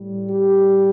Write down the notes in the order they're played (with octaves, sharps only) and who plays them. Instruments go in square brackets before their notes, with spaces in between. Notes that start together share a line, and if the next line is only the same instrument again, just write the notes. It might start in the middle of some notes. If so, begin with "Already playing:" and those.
Already playing: [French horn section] A2 G3
G4